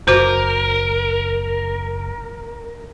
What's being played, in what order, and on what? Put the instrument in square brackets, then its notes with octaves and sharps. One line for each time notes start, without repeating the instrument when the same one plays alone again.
[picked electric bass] F#1 [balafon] F#4 C5 [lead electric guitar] A#4